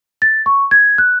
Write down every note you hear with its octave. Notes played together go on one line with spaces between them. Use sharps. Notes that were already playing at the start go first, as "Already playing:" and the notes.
A6
C#6
G#6
F#6